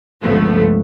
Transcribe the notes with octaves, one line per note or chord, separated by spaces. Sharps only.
G1 C#2 F3 A3 B3